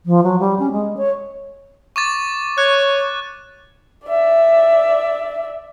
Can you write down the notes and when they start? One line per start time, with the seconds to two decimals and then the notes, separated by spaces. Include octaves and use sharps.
0.06 F3
0.23 F#3
0.40 G3
0.59 C#4
0.72 G#3
0.97 C#5
1.96 C#6 D6 A6
2.58 C#5 F#6
4.06 D5 E5